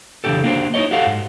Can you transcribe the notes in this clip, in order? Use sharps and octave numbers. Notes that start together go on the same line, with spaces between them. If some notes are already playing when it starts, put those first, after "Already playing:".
C#3 E3 F#3 D4 G4 A4
A#3 D4 F#4 G4 C5
D#4 E4 C5 C#5 D#5
F#4 G4 A4 F5 F#5
G#2